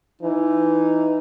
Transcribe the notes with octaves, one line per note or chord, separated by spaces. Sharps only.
E3 D#4